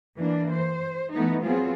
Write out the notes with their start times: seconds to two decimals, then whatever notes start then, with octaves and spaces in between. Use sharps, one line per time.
0.18 E3 A#3 D4
0.54 C5
1.13 E3 A3 B3 D#4
1.45 F#3 B3 C4 F4 G#4